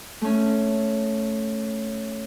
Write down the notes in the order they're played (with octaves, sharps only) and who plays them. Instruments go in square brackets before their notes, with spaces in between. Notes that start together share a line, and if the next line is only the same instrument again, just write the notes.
[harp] A3 C#4